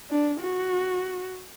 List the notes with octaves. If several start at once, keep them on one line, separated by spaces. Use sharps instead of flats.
D4
F#4